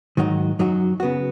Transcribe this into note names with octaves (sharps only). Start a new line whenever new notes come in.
G#2 D#3 F#3 D#4 F#4
F#2 F#3 D#4 F#4
C#3 B3 F#4